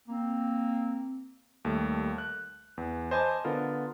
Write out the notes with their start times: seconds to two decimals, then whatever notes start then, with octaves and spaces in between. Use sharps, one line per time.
0.08 A#3 C4
1.65 D#2 G3 A3
2.18 F#6
2.77 E2
3.11 C5 D#5 G#5 A5 B5 D6
3.45 D3 B3 F4 A#4